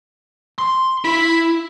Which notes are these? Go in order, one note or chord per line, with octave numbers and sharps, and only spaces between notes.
C6
E4 B5